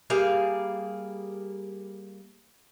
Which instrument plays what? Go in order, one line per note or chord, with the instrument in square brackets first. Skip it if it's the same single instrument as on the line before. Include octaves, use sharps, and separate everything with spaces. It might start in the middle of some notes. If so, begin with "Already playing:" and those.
[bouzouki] G3 A#3 G#4 F5